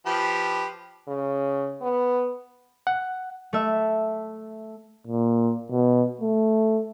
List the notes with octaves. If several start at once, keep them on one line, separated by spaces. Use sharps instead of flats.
F3 G4 B4
C#3
B3
F#5
A3 E5
A#2
B2
A3